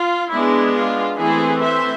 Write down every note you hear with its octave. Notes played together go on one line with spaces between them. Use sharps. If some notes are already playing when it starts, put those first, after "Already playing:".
Already playing: F4
G#3 B3 D4 E4
F4
E3 A3 C4 E4 G#4
C5 E5